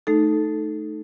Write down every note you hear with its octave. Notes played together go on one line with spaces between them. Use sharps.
A3 D#4 A4